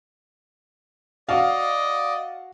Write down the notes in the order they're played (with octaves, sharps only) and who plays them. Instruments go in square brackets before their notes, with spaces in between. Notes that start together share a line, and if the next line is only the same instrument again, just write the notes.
[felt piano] F#4 F5 [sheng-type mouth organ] D5 D#5